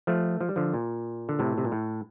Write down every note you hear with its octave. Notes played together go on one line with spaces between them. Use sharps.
F3 A3
F3
G3
D3 F3
A#2
D3
A2 C3
C3
A#2
A2